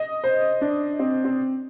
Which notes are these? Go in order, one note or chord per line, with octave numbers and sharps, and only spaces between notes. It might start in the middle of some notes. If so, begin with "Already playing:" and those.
Already playing: D#5
C5
D4
C4
C4